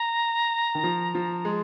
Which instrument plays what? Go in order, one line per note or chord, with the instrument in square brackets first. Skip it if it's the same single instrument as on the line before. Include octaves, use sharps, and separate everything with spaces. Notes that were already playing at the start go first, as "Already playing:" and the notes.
Already playing: [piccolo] A#5
[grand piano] D#3
F3
F3
G#3